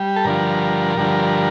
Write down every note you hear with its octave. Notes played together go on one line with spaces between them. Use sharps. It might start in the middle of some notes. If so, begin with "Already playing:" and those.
Already playing: G3
A4
G2 D3 F3 A#4
G2 D3 F3